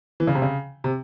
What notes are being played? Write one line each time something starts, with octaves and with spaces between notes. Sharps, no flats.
E3
C#3
C3
C#3
C3